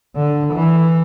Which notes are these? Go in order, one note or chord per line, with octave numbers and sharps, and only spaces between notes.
D3
E3